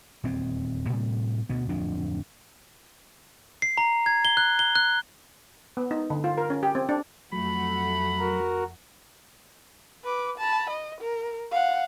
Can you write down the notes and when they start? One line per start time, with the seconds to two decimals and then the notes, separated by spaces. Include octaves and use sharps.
0.24 D#1 E2 C4
0.90 A2 C3 G3
1.49 D2 B2 B3
1.69 D1 F2 F3 D4
3.62 C7
3.78 A#5
4.06 G#6
4.25 G7
4.37 F#6
4.59 G7
4.75 F#6
5.77 B3
5.91 D#4
6.10 D3
6.24 F4
6.38 A#4
6.50 C#4
6.63 G4
6.75 C4
6.89 D4
7.33 F2 F#3 A3 F#5 B5
8.19 F#4 A#4
10.04 B4 D6
10.38 A5 B5
10.70 D#5
11.01 A#4
11.51 F5 F#5